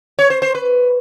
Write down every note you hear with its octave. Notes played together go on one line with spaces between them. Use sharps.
C#5
C5
C5
B4